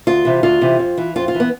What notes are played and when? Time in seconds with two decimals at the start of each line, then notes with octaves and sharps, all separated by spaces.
0.07 D2 F4
0.25 C3 E3
0.43 D2 F4
0.61 C3 E3
0.79 F2
0.98 E3
1.16 F2 F4
1.28 F4
1.35 E3
1.40 B3